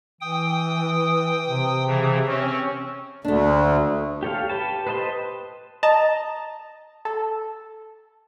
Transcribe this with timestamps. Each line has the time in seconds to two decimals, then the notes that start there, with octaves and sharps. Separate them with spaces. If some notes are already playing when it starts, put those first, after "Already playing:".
0.21 E3 G5 D#6
1.48 C3
1.87 C#3 E3
2.28 C4 C#4 C#5
3.25 D2 A3 D4
4.23 G4 A4 C#5 F5
4.49 G4 B4 A5
4.87 B4 C5 D#5 A5 C6
5.83 D#5 A5 A#5
7.05 A4